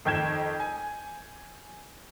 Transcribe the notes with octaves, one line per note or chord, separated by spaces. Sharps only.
F2 D#3 G5 G6 G#6 E7
G#5